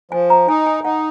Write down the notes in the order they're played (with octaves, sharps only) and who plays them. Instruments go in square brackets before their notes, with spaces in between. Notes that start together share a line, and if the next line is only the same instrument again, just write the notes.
[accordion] F3 [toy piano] G#5
[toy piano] A#5
[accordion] D#4 [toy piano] G#5
[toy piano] G#5
[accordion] D#4 [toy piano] F#5